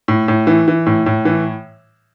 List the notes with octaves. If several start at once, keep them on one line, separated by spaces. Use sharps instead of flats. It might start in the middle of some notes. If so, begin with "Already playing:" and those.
A2
A2
E3
E3
A2
A2
E3